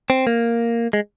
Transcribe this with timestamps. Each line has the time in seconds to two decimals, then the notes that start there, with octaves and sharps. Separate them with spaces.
0.10 C4
0.27 A#3
0.93 G#3